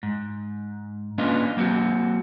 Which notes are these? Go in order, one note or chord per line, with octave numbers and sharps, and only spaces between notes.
G#2
A#3 C#4 D4 F4 B4 D#5
F#3 A#3 C4 F#4